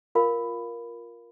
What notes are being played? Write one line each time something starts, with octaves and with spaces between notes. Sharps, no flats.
F4 A#4 F5 B5